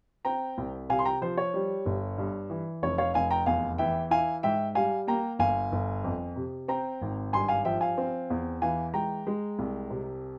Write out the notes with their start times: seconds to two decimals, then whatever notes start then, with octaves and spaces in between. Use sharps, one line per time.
0.25 C4 G5 A#5
0.58 C2
0.89 C3 F5 G#5
0.99 C6
1.05 G5 A#5
1.22 F3 C5
1.38 C#5
1.54 G3
1.86 G1
2.18 G2
2.50 E3
2.82 F1 C#5
2.98 C#5 F5
3.14 F1 F5 G#5
3.31 G5 A#5
3.46 E2 F5 G#5
3.78 E3 E5 G5
4.11 E4 F5 G#5
4.43 G#2 E5 G5
4.75 G3 F5 G#5
5.07 A#3 G5 A#5
5.39 G1 F5 G#5
5.72 G1
6.04 F2
6.36 C3
6.68 C4 G5 A#5
7.01 G#1
7.33 G2 G#5 C6
7.48 F5 G#5
7.65 F3 E5 G5
7.81 F5 G#5
7.98 C4
8.30 E2
8.62 E3 F5 G#5
8.94 G#3 G5 A#5
9.27 G#3
9.59 C2
9.90 C3